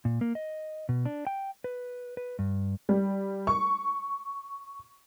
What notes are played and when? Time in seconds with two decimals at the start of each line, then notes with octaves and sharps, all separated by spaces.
0.05 A#2
0.21 A#3
0.35 D#5
0.89 B2
1.05 D4
1.27 G5
1.64 B4
2.17 B4
2.39 G2
2.89 G3
3.47 C#6